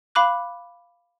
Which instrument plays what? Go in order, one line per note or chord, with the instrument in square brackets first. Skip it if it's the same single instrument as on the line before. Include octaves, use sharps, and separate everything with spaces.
[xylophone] F5 B5 D6 F#6